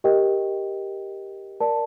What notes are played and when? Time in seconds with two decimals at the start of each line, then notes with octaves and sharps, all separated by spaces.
0.04 G4 A#4 D#5 G5
1.60 A#4 D5 A5